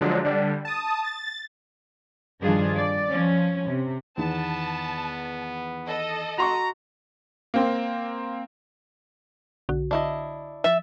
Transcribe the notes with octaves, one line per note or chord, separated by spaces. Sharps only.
D3 F3 F#3 G#3
D3 G3
A5 D#6
A6
G2 D#3 F3 D4 F4 G#4
D5
F3 C#4
C3
E2 D#3 B3 A5
A4 D#5
F#4 A#5 C6 C#6
A#3 C4
B1 D3 F#4
D3 D4 E4 D#5
F3 E5 A6